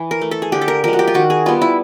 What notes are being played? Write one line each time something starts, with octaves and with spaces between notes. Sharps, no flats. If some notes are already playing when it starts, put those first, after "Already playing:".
Already playing: E3
A#4
A3
A4
G#4
D3 G4
A4
A#4
F3 G#3 A#4
F#4
G4
F4
D#3 F#4
G#4
G3 B3 F4
E4